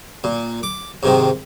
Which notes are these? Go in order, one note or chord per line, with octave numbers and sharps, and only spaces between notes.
A#2
D6
G#2 C3 D#3